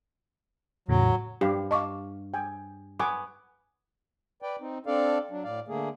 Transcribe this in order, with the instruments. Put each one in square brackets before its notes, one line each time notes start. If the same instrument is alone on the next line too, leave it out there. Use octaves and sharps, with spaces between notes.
[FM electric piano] E2 A2 C#3 [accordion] F#3
[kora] G2 [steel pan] G4 F5
[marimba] D#5 C#6 D6 [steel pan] F5 A5
[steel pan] G5 G#5
[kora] B3 [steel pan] G#5 C#6 D6
[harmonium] B4 D5 G5
C4 D#4
C4 D4 A4 D5 F5
F#3 D4
A2 D5 F5
D3 A3 A#3 G#4